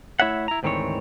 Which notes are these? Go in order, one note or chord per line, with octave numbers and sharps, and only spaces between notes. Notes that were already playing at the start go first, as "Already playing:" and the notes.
A3 E4 C#5 E5 F#5
E4 A#5
D2 G#2 D#3 E3 C4 C#5